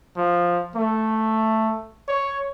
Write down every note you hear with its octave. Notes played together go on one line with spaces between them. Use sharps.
F3
A3
C#5